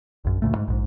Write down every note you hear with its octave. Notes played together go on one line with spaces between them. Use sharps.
A#1 F#2
D2 A#2 A3
G#2
A#1 G#2